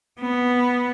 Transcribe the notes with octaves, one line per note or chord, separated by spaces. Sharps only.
B3